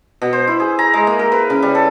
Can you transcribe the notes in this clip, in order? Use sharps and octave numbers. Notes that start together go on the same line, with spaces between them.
B2
C5
E4
G#4
A#5
G#3
A#3
A#4
B4
C#3
G3
A4